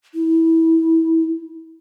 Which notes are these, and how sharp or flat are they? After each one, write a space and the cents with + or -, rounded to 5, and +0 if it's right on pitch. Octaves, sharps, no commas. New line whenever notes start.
E4 -20